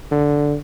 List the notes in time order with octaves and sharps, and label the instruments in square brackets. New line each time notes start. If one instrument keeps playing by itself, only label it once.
[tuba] D3